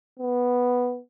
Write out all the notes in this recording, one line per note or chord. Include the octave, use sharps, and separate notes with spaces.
B3